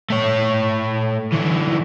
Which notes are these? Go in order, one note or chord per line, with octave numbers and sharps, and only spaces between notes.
A3 C#5
D3 E3